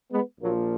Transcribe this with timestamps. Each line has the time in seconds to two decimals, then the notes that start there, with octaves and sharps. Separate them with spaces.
0.12 G#3 B3
0.41 A#1 A#2 F3 F#3 A#3